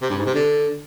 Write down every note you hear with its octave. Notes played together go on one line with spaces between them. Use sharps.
C3
G2
G#2
C3
D3